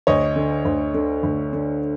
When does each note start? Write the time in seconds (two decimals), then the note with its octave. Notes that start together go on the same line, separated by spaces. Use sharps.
0.07 D2 C#5 D#5
0.36 D3
0.65 D2
0.94 D3
1.23 D2
1.53 D3